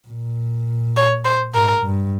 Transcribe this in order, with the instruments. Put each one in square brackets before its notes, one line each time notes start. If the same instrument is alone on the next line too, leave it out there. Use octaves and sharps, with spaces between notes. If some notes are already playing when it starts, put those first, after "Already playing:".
[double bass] A#2
[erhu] C#5
C5
[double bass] G#2 [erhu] A#4
[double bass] G2